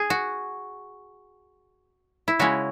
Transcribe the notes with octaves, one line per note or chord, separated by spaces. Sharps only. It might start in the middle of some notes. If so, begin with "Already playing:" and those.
Already playing: G#4
F#4
E4
C#3 G#3 C#4 E4 F#4